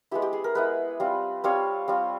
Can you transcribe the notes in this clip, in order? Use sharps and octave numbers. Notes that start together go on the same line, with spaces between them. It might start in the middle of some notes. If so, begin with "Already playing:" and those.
G#3 B3 E4 G4
G4
G#4
A#4
G#3 B3 E4 B4
G3 C4 F4
G3 C4 F4 C#5
G3 C4 F4